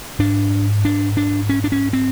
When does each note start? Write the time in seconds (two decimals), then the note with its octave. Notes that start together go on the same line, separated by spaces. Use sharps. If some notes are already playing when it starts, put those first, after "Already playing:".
0.19 G#2 D4
0.85 D4
1.17 D4
1.49 C#4
1.64 D4
1.72 C#4
1.93 C4